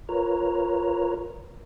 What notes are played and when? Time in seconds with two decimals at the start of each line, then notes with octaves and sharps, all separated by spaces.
0.09 F4 A#4 B4 C#5 A#5